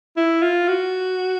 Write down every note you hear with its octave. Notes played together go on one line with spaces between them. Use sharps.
E4
F4
F#4